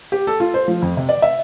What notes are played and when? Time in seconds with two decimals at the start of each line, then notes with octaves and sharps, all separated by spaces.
0.12 G4
0.27 A4
0.40 F4
0.54 C5
0.68 F3
0.82 F2
0.97 C3
1.09 D5
1.22 E5